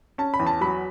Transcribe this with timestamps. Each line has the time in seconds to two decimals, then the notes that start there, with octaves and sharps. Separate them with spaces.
0.18 C#4 A5
0.34 B5
0.40 E2
0.47 A5
0.61 F#3 B5